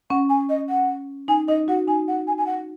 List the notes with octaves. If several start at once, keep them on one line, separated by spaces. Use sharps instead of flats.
C#4 F#5
G#5
D#5
F#5
D#4 G#5
D#4 D#5
F#4 F#5
D#4 G#5
F#5
G#5
G#5
F#5